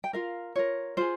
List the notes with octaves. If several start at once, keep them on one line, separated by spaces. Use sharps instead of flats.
G5
F4 A#4 F5
F4 A#4 C#5
F4 G#4 C5